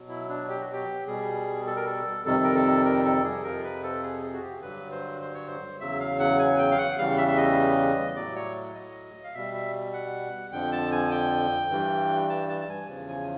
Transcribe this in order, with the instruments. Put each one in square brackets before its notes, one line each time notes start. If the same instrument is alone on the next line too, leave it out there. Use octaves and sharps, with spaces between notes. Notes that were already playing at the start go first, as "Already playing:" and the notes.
Already playing: [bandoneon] B2 F#3
E4
D4
G4
F#4
G4
B2 G3 G#4
A4
A#4
A4
F2 C3 D#3 G3 A4
A#4
A4
A#4
A4
G#4
F2 C3 F3 A#4
B4
A4
G#4
G#4
F#4
G4
G2 D3 F#3 B4
C5
C5
C#5
C5
E2 C#3 F#3 E5
F5
F#5
G#5
G5
F5
F#5
E2 C#3 E3 G3 F5
E5
E5
D#5
A2 F#3 D5
C#5
D#5
F5
B2 G3 E5
E5
F#5
F2 D3 F3 G5
A5
G#5
G5
G2 E3 G3
A5
A5
A5
G#5
E2 C#3 F3
G#5